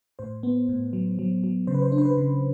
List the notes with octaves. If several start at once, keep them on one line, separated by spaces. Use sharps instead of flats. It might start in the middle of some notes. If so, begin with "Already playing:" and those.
A2 C5
B3
A2
F#3
F#3
F#3
C#3 C5
B4
C5
D4
C5
B4
C#3